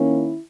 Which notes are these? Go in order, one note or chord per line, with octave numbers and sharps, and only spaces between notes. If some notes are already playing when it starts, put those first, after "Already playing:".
Already playing: D#3 A#3 C#4 E4